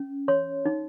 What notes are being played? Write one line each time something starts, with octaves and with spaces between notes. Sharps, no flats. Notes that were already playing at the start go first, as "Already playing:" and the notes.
Already playing: C#4
C#5 C6
D#4